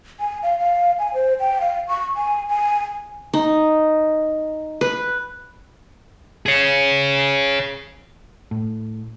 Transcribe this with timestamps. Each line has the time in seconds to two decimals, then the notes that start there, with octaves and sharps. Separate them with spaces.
0.20 G#5
0.43 F5
0.59 F5
0.99 G#5
1.14 C5
1.40 G5
1.61 F5
1.88 C#6
2.16 G#5
2.49 G#5
3.33 D#4
4.81 B4
6.46 G#4 C#5
8.51 A2